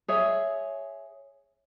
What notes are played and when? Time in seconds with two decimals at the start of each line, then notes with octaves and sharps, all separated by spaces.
0.08 G#4 C#5 E5